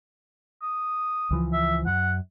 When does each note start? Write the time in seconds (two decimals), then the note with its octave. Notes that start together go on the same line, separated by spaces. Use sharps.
0.62 D#6
1.31 C#2 E3 F3
1.52 E5
1.86 F#2 F#5